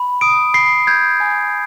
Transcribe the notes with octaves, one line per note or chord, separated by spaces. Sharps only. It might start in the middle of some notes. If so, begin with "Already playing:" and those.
Already playing: B5
D#6 D7
B5 C7
G6 G#6
G#5